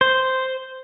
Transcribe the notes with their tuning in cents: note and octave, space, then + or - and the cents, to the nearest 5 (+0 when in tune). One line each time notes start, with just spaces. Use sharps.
C5 -5